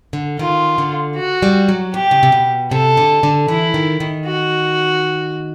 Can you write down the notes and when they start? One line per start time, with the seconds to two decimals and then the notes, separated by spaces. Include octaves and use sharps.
0.13 D3
0.39 D#3 F4
0.78 D3
1.17 F#4
1.43 G3
1.69 F#3
1.94 C3 G4
2.11 C#3
2.23 C3
2.32 B2
2.71 C3 A4
2.97 D3
3.23 D3
3.48 E3 E4
3.74 D#3
4.00 D#3
4.26 F#4